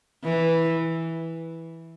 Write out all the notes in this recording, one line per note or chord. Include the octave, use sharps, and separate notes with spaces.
E3